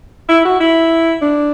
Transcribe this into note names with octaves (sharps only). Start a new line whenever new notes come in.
E4
F#4
E4
D4